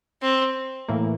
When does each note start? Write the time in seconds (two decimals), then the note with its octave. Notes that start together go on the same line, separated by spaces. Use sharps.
0.22 C4
0.88 A2 E3 A#3